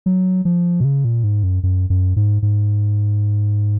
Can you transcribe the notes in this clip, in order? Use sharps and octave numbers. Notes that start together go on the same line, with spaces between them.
F#3
F3
B2
C#3
A#2
G#2
F#2
F#2
F#2
G#2
G#2